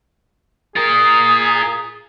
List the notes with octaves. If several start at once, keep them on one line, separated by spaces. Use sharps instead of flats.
F4 G#4 A#4